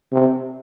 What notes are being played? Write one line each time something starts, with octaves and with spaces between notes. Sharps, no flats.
C3